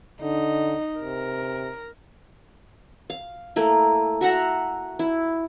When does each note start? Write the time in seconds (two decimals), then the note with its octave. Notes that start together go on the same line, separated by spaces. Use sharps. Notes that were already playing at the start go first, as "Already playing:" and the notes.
0.22 D3 D#4
1.00 C3 A#4
3.10 F5
3.56 A3 A#3 E4
4.21 F#4 E5 F#5 A#5
4.99 E4